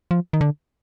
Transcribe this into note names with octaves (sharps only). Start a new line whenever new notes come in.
F3
D#3
D3